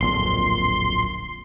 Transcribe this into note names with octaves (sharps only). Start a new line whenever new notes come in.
D1 A#1 F2 C6